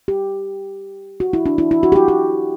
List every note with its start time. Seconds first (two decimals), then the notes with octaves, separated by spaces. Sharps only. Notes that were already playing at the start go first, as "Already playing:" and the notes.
0.08 G4
1.20 F#4
1.33 E4
1.46 D4
1.58 E4
1.71 E4
1.83 F#4
1.92 G4
1.96 F#4
2.08 G4